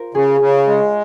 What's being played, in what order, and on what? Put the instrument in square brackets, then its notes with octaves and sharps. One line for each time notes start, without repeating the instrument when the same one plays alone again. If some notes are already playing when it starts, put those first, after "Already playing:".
Already playing: [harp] F4 A#4 C5
[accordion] C#3 [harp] G#4
[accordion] C#3
G#3